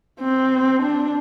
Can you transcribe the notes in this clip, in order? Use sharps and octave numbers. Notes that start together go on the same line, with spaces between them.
C4
D4